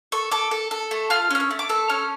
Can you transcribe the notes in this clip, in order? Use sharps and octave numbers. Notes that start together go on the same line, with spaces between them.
A4 C#6
A4 D6
A4
A4
A3
F4 F6
C#4 F6
E6
A3
D6
A4 E6
C#4 F6